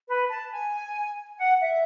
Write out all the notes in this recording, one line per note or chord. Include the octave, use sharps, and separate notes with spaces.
B4
A5
G#5
F#5
E5